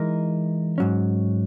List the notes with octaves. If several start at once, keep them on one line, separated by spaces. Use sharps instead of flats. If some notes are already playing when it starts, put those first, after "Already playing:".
Already playing: E3 G#3 D#4 A#4
G#2 F#3 C#4